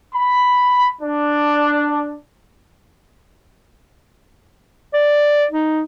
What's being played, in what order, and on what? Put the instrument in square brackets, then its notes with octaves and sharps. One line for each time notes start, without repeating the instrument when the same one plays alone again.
[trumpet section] B5
D4
[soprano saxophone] D5
D#4